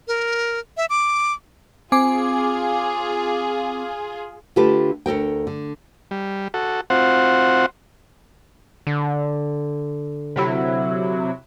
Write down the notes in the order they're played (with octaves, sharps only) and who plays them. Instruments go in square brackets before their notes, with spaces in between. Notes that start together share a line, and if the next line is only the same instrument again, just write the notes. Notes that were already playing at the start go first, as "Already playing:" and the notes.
[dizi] A#4
E5
D6
[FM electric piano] C4 G#5 D6 [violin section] F4 G#4
[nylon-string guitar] D3 A3 F4 G4 A4 B4
D2 A4 A#4 G5
D3
[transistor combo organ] G3
F#4 A4
C4 F4 F#4 C5 F#5
[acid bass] D3
[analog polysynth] C3 F#3 E4